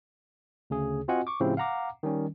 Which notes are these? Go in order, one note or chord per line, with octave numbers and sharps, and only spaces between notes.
D2 C#3 G#4
C4 F4 F#4 D#5 F#5 G#5
C#6 D6
A2 C#3 F3 C4 E4 G4
F5 F#5 A#5 D6
D#3 G3 C#4